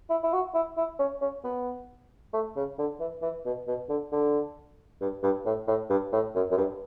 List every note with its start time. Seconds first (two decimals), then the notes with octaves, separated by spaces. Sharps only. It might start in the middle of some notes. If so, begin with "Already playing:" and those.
0.09 E4
0.23 E4
0.33 F#4
0.54 E4
0.77 E4
0.99 C#4
1.21 C#4
1.44 B3
2.33 A3
2.56 C#3
2.78 D3
3.00 E3
3.22 E3
3.45 B2
3.67 B2
3.89 D3
4.12 D3
5.01 G2
5.23 G2
5.46 A2
5.68 A2
5.90 G2
6.12 A2
6.35 F#2
6.51 F#2
6.57 G2